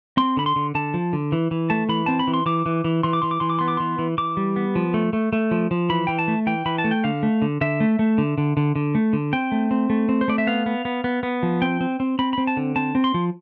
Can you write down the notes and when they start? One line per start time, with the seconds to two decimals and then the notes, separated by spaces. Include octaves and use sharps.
0.17 C4 C6
0.37 D3 B5
0.46 C6
0.56 D3
0.75 D3 A5
0.94 F3
1.13 D3
1.32 E3
1.51 E3
1.70 A3 A5
1.89 E3 B5
2.06 C4 A5
2.19 B5
2.27 E3
2.34 C6
2.46 E3 D6
2.66 E3
2.84 E3
3.03 E3 C6
3.13 D6
3.22 E3 C6
3.31 D6
3.40 E3 C6
3.50 D6
3.59 B3 C6
3.68 D6
3.77 E3 C6
3.99 E3
4.18 E3 D6
4.37 G3
4.56 B3
4.75 F3
4.94 A3
5.13 A3
5.33 A3
5.51 F3
5.71 F3
5.90 E3 B5
6.07 E3 G5
6.19 A5
6.28 A3
6.47 E3 G5
6.66 E3 B5
6.78 A5
6.84 A3
6.91 G5
7.04 D3 F5
7.23 A3
7.42 D3
7.61 D3 E5
7.80 A3
7.99 A3
8.18 D3
8.38 D3
8.57 D3
8.76 D3
8.95 A3
9.13 D3
9.33 C4 G5
9.52 A3
9.71 C4
9.90 A3
10.09 C4
10.21 C5
10.28 A3 D5
10.38 E5
10.47 B3 F5
10.66 B3
10.85 B3
11.04 B3
11.23 B3
11.43 F3
11.62 C4 G5
11.81 C4
12.00 C4
12.19 C4 B5
12.33 C4 B5
12.47 A5
12.57 D3
12.76 C4 A5
12.95 C4
13.04 C6
13.14 F3